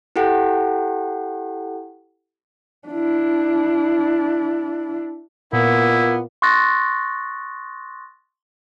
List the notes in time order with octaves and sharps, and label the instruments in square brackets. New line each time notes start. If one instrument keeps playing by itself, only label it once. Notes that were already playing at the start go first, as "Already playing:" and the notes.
[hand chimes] E4 G4 A4 F#5 G5
[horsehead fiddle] D4 E4
[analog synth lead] A#2 [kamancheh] A#3 [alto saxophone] B3 [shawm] E4
[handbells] C6 C#6 D#6 F#6 A6 A#6